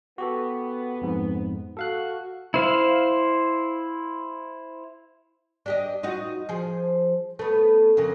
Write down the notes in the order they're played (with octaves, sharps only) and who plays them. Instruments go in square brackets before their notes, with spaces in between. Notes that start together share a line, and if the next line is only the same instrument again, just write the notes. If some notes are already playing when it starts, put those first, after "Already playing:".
[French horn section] B3 [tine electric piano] F#4 G4 A4
[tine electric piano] F2 G#2
[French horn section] F#4 [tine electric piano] A4 F5 F#6
[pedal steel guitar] E4 C5 F5
[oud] D4 G4 D#5
D#4 F4 F#4
F3 G#4
A3 B3
F2 C#3 A#3